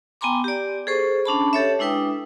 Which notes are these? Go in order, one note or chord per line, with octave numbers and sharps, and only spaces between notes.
B3 G5 G#5 A#5 C6 D6
G4 D5
G#4 A4 C5 C#6
C#4 D4 A5 B5
G4 A4 C#5 E5
G#3 D4 E4 B4 G5 D#6